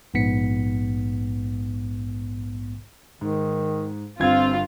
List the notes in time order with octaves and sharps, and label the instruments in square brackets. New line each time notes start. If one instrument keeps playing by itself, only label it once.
[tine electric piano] A#1 G#2 B3 B6 C#7
[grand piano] G#2 [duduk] D#3
[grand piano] G1 G#6 [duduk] C4 [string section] F4